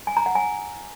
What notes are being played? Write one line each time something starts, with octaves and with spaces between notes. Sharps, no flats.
G#5
A#5
F#5
G#5